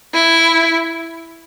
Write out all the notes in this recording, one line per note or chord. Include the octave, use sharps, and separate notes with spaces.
E4